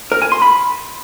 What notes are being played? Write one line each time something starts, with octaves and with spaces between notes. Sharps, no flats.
A#4
G#5
C6
B5